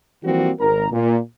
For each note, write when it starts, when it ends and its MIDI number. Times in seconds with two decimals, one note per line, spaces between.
0.23 0.51 52
0.23 0.51 53
0.23 0.51 55
0.23 0.51 58
0.23 0.51 60
0.23 0.51 66
0.60 0.86 32
0.60 0.86 70
0.60 0.86 82
0.91 1.18 46